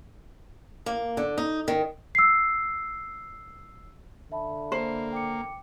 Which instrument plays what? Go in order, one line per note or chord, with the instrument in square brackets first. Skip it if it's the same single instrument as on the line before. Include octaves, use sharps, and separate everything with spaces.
[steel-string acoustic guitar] A#3
D3
D#4
D#3
[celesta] E6 C7
[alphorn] D3 [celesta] E5 A5 B5
[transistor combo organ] A#3 [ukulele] C5
[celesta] G5 D6 C#7